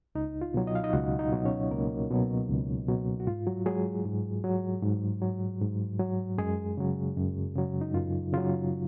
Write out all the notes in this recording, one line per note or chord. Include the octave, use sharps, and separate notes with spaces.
C#2 D#4
F4
B2 F#3
D#5
F5
D#4 D#5
C#2 F#4 F#5
D#4 D#5
B2 F#3
C#4 C#5
C#2 A#3 A#4
B2 F#3
C#2
B2 F#3
F#4
G#2 F4
F#3 F#4
F#3 G#3 G#4
G#2
F#3
G#2
F#3
G#2
F#3
F#2 G#3 G#4
C#3 F#3
F#2
C#3 F#3
D#4
F#2 F4
C#3 F#3 F4